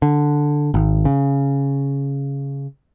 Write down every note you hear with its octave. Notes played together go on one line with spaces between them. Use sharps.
D3
G#1
C#3